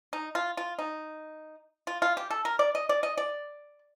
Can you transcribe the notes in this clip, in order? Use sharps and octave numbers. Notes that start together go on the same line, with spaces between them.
D#4
F4
F4
D#4
F4
F4
G4
A4
A#4
D5
D#5
D5
D#5
D5